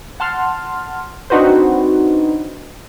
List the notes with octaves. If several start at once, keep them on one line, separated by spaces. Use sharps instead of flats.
F#5 A5 C6 F6
C4 D4 D#4 F#4 B4 C5